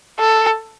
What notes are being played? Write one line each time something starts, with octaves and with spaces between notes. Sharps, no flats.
A4